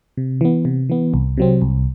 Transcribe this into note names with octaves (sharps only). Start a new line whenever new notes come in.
C3
E3 B3
C3
E3 B3
C2
C3 F#3 C4
C2